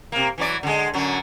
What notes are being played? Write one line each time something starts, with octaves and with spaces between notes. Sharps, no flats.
C3 A#3
E3 F#3 D5
D3 G#3
F#2 D3 F#3